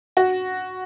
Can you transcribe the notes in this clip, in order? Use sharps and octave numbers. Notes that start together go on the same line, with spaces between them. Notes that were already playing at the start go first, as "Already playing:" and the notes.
F#4